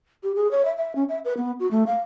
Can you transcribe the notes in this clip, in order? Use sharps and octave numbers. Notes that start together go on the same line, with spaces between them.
G4
G#4
C#5
E5
E5
C#4
E5
B4
B3
F#4
A3
F5